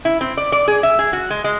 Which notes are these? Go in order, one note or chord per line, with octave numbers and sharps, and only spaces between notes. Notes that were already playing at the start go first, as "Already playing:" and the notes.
E4
C4
D5
D5
G#4
E5
G#4
F#4
G#3
G#3